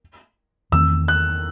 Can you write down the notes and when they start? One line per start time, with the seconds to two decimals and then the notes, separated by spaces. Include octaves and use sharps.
0.72 E2 D#3 A3 C4 E6
1.08 F#6